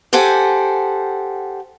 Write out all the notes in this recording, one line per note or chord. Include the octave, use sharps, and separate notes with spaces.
G4 A4 C5 F#5 G#5